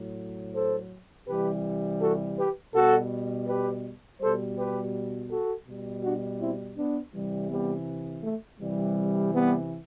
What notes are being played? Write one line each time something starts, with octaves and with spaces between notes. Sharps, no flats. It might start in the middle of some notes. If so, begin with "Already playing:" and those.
Already playing: A2 F#3
A4 C5
C3 E3 G3 G4 B4
F#4 A4
G4 B4
B2 G3 F#4 A4
G4 B4
B2 G3 A4 C5
G4 B4
F#4 A4
B2 G3
D4 F#4
C4 E4
B3 D4
C3 E3 G3
G3 B3
A3
C3 E3 G3
G3 B3